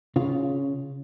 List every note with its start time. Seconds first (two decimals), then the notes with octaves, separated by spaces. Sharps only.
0.16 C#3 F4